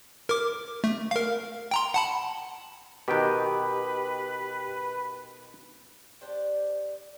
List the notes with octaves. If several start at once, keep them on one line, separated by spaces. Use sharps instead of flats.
A#4 D6
A3
A#4 F5
G5 A#5 C6
F#5 A5 B5
B2 D#3 G4 B4 G5
D4 G4 C5 D5